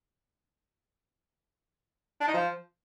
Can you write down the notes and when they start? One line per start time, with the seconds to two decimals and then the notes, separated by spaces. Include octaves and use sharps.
2.21 D4
2.27 D#4
2.34 F3